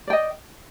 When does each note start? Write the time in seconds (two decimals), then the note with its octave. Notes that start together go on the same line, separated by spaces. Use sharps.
0.07 D5
0.10 G5
0.13 D#5